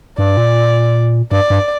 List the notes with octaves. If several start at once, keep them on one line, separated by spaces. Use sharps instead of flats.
G2 D5
A#2
G2 D5
G2